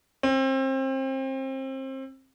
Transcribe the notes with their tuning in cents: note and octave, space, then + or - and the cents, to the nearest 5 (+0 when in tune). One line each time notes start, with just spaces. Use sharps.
C4 +30